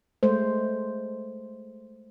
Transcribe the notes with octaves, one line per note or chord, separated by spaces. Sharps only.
G#3 A3 C5